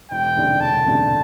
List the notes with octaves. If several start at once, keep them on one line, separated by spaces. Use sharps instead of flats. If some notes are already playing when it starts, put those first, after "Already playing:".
E1 G5
D2 C3 G3 D4
E1 A5
D2 C3 G3 D4